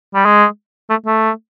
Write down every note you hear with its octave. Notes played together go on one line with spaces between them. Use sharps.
G3
G#3
A3
A3